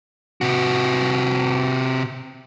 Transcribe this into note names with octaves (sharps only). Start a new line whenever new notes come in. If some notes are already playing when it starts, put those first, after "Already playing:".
C3 F#4